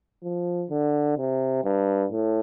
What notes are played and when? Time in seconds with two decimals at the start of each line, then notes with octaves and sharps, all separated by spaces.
0.23 F3
0.71 D3
1.17 C3
1.64 G2
2.11 A2